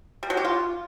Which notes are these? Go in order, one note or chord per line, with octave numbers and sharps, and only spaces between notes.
G3
F#3
G4
F4